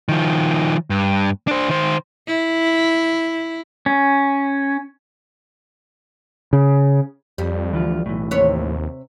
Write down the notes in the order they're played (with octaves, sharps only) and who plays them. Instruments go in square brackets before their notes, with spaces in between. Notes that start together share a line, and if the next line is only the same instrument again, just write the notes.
[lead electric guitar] D#3 F3
G2
D4 C5
D#3 C5
[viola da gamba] E4
[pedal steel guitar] C#4
[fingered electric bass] C#3
[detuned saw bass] F2 [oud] G3
[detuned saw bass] D2 [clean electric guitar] E3 F3 F4
[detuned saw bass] B1 [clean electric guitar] A2 E3
[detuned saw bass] D#2 [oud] C3 B4 C#5